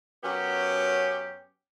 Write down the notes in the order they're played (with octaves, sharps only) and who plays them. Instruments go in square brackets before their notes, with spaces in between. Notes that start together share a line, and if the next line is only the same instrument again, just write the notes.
[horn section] F#2 F#3 B3 C#4 G4